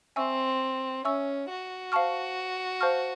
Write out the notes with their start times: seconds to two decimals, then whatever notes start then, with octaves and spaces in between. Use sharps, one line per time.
0.16 C4 E5 G#5 C#6 E6
1.04 C#4 E5 G#5 C#6 E6
1.49 F#4
1.92 C5 F5 A5 C#6 F6
2.81 C5 F5 A5 C#6 F6